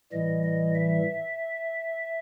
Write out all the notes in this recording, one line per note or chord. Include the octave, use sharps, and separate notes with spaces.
A2 E3 G3 D#5
D#5
E5